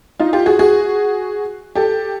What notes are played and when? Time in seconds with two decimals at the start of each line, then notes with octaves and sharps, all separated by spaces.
0.20 D#4 F4
0.33 F4 G4
0.46 F#4 G#4
0.59 F#4 G#4
1.75 G4 A4